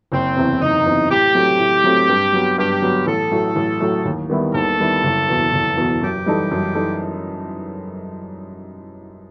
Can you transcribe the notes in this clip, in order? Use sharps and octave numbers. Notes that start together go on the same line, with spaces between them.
F#1 C4
E2 C3
F#1 D#4
E2 C3
A2 G4
F#3 A3 C4
A2
F#3 A3 C4
G2
F#3 B3
G2 G4
F#3 B3
A1 A4
A2 F#3 A3
A1
A2 F#3 A3
D#2
D#3 G3 B3 E4
D#2 A4
D#3 G3 B3 E4
F#1
E2 B2
F#1
E2 B2
F#2 G4
E3 G3 D#4 A4
F#2
E3 G3 D#4 A4